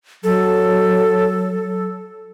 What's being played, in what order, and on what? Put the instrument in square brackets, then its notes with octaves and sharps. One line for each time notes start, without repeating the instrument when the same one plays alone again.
[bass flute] F#3 [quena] A4